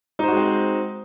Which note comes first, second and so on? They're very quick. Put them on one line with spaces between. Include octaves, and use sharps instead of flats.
D#4 C5 F#4 G#3 C4